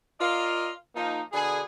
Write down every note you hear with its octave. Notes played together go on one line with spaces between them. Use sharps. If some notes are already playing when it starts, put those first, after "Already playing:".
F4 A#4 D5 D#5 F5
F3 A#3 D#4
B2 D3 D4 G#4